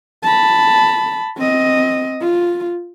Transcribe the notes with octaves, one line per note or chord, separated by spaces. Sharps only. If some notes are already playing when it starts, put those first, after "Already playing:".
A5 B5
C4 D#5
F4